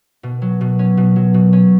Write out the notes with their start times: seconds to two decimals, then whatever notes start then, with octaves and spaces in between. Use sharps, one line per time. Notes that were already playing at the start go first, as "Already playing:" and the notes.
0.23 B2
0.42 F#3
0.61 B2
0.79 C#4
0.97 B2
1.16 F#3
1.34 B2
1.53 C#4